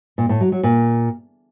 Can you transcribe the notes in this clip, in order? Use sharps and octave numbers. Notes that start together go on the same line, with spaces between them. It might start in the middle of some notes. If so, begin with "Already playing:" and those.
A#2
A2
F#3
F#3
A#2